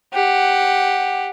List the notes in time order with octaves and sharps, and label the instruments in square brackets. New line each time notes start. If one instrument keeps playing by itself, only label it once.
[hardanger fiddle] G4 F#5